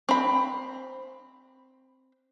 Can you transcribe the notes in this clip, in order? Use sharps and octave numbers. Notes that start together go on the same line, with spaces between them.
C4 B5